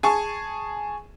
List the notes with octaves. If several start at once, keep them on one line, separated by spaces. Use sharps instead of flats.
G#4 G#5 A5 C#6